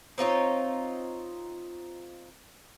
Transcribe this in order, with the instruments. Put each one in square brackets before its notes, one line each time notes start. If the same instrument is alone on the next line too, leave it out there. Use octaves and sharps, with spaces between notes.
[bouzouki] C4 D#4 F4 C#5